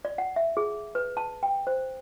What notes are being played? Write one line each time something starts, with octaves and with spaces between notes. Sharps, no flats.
D5
F#5
E5
G#4
B4
A5
G5
C5